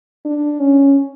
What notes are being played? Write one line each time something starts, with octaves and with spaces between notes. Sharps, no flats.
D4
C#4